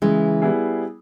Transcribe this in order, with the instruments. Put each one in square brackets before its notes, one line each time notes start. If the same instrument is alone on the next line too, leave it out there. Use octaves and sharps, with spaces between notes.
[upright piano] C#3 [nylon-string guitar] E3 G#3
[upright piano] G3 B3 E4 G#4